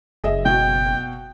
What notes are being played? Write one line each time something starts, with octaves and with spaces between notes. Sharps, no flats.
F#1 G#4 D#5 E5
B2 F#4 G5